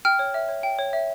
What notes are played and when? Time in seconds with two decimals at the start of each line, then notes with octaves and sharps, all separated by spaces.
0.05 G5 F6
0.19 C#5
0.34 E5
0.49 C#5
0.63 G5
0.79 C#5
0.93 E5